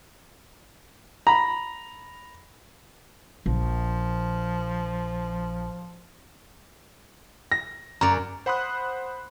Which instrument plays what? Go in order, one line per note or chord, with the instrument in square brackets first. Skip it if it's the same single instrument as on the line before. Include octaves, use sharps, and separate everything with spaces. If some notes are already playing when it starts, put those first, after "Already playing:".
[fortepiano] A#5 B5
[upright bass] A#1 [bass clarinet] F3
[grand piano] A#6
[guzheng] F#2 D5 [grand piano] A#5
[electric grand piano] C5 F#5 B5 C6 D#6 F#6